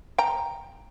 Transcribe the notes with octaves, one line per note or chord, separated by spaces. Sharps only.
G5 A#5